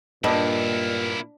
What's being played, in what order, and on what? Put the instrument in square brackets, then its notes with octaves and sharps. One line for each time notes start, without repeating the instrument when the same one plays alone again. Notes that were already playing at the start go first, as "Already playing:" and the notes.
[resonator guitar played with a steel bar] G2 [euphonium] A#2 [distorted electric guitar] A#3 E4 [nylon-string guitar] D#5